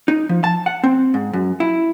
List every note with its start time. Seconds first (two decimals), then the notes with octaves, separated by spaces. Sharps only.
0.08 D#4
0.29 F3
0.44 A5
0.66 F#5
0.84 C4
1.14 G#2
1.33 F#2
1.60 E4